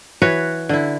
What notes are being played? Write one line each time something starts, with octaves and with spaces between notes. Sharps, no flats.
E3 F#4 B4 C#5
D3 E4